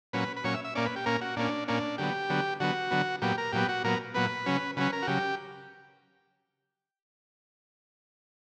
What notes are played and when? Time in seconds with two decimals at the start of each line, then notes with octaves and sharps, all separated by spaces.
0.13 A#2 F#3 C#4 B4
0.37 B4
0.44 A#2 F#3 C#4 C#5
0.54 E5
0.65 E5
0.75 A#2 A#3 C#4 D5
0.86 B4
0.96 G4
1.06 A#2 A#3 C#4 A#4
1.21 F#4
1.36 A#2 A#3 C#4 D4
1.68 A#2 A#3 C#4 D4
1.98 D3 F#3 B3 G4
2.30 D3 F#3 B3
2.60 D3 F#3 B3 F#4
2.91 D3 F#3 B3
3.22 A#2 F#3 B3 G4
3.38 A#4
3.53 A#2 F#3 B3 G4
3.69 F#4
3.84 A#2 F#3 B3 A#4
4.14 A#2 F#3 B3 B4
4.46 C#3 F#3 C#4
4.77 C#3 F#3 C#4 B4
4.93 A#4
5.02 F#4
5.07 C#3 F#3 G4